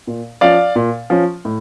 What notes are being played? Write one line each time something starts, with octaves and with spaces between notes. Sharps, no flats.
A#2
F3 C#4 D5 F5
A#2
F3 C#4
A2